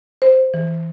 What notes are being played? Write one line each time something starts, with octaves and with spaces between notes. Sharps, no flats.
C5
E3